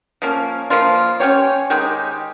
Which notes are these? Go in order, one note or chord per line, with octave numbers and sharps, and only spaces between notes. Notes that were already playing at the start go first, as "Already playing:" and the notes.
F3 A#3 C#4
F3 A#3 F4
C#4 G4 C#5
D#3 G#3 D#4 G4